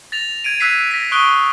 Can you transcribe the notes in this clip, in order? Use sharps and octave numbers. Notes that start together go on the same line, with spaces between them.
A6 A#6 F7
G#6 D7 D#7
E6 F#6 G#6 B6 C7 D#7
A#6 B6
C#6 D#6 F#6 D7 G7